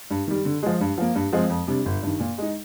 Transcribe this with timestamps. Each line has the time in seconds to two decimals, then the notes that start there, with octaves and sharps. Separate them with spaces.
0.10 G2
0.27 D#3 G3
0.45 D3
0.62 F3 G#3
0.80 G2
0.98 F3 A#3
1.15 G2
1.33 F3 G#3 C4
1.49 F2
1.67 C3 G3 D4
1.85 G1
2.02 G2 D#3
2.20 A#2
2.38 G#3 D#4